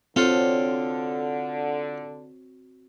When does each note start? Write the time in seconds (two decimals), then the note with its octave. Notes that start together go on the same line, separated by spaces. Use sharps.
0.16 D3 C4 F4 F#4 A4 C#5 G6